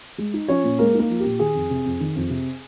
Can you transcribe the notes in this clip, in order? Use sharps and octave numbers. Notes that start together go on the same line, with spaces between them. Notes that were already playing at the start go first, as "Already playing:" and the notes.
G#3
D#4
F3 C#4 C#5
A#2
G#3 A#3 A#4
A#3 D#4 A#4
F3
A#2 G4
D#3 G#4
F2
C3
F2
D#3
F2
C3